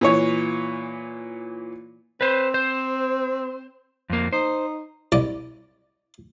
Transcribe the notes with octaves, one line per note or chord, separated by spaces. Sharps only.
A#2 E3 C#5
C4 B4 C5
C5
F2 A#3
D#4 C5
C2 D5 D#5